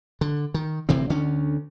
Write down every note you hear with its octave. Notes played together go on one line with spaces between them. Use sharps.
D3
D#3
D1 C3 E3 C4
D2 D3 C#4